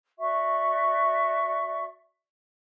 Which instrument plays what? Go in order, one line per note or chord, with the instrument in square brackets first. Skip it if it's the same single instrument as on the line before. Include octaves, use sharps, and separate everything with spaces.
[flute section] F#4 D5 E5 C#6